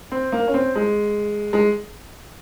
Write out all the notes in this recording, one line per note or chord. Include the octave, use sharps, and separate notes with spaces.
C4
A#3
C#4
C4
G#3
G#3